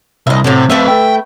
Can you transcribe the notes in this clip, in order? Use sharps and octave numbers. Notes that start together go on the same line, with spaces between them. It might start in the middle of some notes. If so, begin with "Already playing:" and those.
C2 D#5 E5
A2 C3 F#3 A4
A3 C4 A4 B4 E5
G5